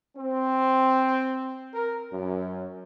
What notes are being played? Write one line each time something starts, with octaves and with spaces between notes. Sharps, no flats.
C4
A#4
F#2